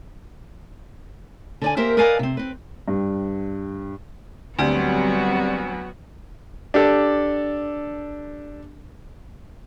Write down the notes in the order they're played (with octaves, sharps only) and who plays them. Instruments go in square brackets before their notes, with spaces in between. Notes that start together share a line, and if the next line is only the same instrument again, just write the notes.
[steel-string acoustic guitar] D3 D5 G#5
A#3 G4 A#4 C5 E5 G5
A#4 B4 D5 D#5 F5 G#5
C3 C4
C4 B4
[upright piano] G2
[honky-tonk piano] D2 [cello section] F#3 G3 [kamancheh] B3 F#4 [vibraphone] C4 G4 D5
[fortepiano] D4 G4 A4